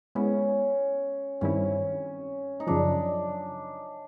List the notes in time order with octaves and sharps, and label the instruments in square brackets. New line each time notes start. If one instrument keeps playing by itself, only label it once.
[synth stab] G#3 B3 E4 [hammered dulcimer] C#4
[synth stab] G2 D#3 G3 C4 E4 [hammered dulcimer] C#4
[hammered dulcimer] D#4
[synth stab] F#2 C#3 F3 [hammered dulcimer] D4